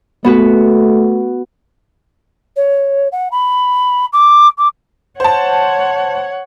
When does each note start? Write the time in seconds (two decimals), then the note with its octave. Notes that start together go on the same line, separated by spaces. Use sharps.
0.24 A3 B3 F#4 B4
2.56 C#5
3.12 F#5
3.31 B5
4.13 D6
4.58 D6
5.20 C5 C#5 F#5 A5